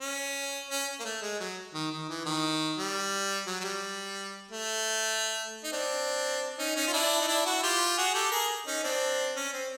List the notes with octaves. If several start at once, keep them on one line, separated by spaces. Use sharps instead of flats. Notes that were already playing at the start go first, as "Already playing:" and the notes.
C#4
C#4
A#3
A3
G#3
F#3
D#3
D#3
E3
D#3
G3
F#3
F#3
G3
A3
D#4
C4 D4
C#4 D#4
C#4 D#4
F4
D4 E4
D#4
D4 E4
E4 F#4
F4 G4
F#4 G#4
G4 A4
G#4 A#4
C#4 D#4
C4 D4
C#4
C4